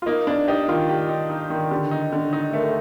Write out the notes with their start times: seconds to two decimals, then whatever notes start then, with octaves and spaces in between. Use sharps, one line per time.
0.02 F4
0.06 A#3 D#4
0.27 A#3 D4
0.48 D#4 G4
0.68 D#3 F4
0.89 G4
1.09 D#4
1.30 D#4
1.50 D#3
1.71 D3 G4
1.91 D#4
2.12 D3
2.33 D#4
2.53 A3 A#4
2.62 A4